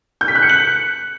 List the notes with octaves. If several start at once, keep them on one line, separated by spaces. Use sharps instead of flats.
G6
B6
F#6
C#7
F#7